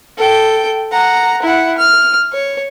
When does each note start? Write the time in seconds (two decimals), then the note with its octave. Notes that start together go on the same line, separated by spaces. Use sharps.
0.17 A4 G5
0.92 F#5 A#5
1.42 E4 F#5
1.78 F6
2.33 C#5